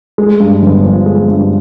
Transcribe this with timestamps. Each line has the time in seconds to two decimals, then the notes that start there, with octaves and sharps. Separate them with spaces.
0.18 G#3
0.40 G2
0.62 G1
0.84 F3
1.06 G#3
1.28 G2